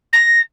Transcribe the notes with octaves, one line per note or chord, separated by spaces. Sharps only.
A#6